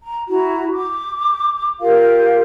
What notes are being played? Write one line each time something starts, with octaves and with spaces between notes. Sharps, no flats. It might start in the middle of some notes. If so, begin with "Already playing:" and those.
A#5
E4 F#4 A#5
D6
F4 G4 A#4 F5